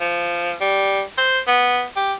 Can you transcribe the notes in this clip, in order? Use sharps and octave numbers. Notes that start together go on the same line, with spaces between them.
F3
G3
C5
B3
G4